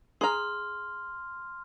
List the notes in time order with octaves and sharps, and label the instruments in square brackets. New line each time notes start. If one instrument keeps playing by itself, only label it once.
[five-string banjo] G#4 A#5 [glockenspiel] C6 F6